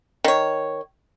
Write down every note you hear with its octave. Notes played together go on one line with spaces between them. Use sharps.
D#3 C#5